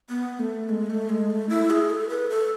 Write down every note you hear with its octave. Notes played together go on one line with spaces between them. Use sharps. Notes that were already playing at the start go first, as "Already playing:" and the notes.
B3
A3
G#3
A3
G#3
A3
E4
G#4
A4
B4
A4